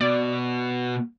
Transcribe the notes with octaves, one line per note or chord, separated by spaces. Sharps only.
B2 D5